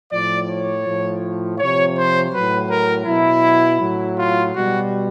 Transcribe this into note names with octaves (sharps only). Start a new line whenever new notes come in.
A2 F3 D5
C#5
A2 F3
C3 F3 C#5
C5
A2 F#3 B4
A#4
B2 F#3 E4
A2 F#3
F4
B2 G3 F#4